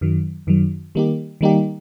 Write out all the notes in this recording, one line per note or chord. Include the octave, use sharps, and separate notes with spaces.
F#2 D#3 F#3
F#2 D#3 F#3
D#3 G3 A#3 D#4 G4
D#3 G3 A#3 D#4 G4